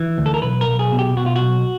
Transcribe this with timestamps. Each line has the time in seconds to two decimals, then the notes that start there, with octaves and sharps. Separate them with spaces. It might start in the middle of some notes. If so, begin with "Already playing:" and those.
Already playing: E3
0.18 D2
0.26 A4
0.34 A#4
0.42 B1 B4
0.61 A#4
0.67 B1
0.79 G#4
0.92 B2
0.99 G4
1.17 B2 F#4
1.26 F4
1.36 F#4
1.41 B1